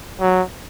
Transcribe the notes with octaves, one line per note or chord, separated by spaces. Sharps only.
F#3